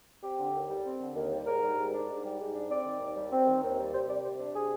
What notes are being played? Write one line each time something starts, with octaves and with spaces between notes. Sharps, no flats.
C4 G4
D3
D#2
G3
C4
D3
D#2
G3
G#2 A#4
G3
G#2
D4
G#2
G3
G#2
D4
C4 D5
D#3
D#2
G3
C4
D#3
D#2
G3
C3 C5
G3 D5
C3 C5
D4
C3 G#4